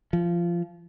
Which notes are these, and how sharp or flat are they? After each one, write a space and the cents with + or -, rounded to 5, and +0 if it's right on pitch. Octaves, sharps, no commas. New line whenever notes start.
F3 -20